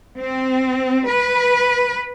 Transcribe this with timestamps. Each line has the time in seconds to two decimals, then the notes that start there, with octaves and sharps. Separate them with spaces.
0.18 C4
1.06 B4